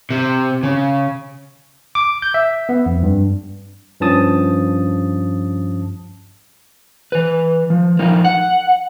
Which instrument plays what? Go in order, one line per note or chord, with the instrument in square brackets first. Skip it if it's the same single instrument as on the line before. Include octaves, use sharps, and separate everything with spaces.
[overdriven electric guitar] C3
C#3
[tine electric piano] D6
G6
E5
B3
F2
G2
G2 F3 C#4 A5 D#6
[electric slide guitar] E3 B4
F3
F3 D#4 A#4
F#5